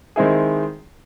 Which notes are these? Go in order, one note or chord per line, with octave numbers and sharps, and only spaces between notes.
D#3 G#3 C4 E4 G#4